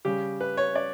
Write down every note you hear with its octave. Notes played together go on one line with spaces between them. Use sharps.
C#3 G3 G4
B4
C#5
D5